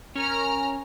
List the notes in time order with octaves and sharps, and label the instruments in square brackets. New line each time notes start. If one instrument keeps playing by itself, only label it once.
[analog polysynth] C#4 [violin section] A#4 A#5 F6